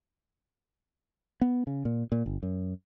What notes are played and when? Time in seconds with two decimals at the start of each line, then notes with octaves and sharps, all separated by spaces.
1.41 B3
1.67 C#3
1.85 A#2
2.12 A#2
2.26 G1
2.43 F#2